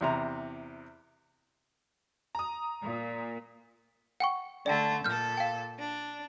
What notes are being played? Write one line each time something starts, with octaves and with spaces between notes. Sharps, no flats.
E2 C3 A#5
A#5 D#6
A#2
F#5 G5 C#6
D3 A3 D5 G5 A5
A#2 A4 F6 G6
F5 G5
D4